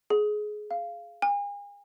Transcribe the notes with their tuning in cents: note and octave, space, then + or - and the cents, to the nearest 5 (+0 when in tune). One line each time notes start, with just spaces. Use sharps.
G#4 +20
F5 -15
G#5 -40